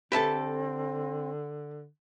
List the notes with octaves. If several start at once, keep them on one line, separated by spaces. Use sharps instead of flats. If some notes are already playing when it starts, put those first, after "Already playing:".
D3 C4 G4 A4 B4 E5 A5